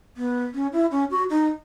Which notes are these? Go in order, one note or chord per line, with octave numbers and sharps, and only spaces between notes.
B3
C#4
E4
C#4
F#4
D#4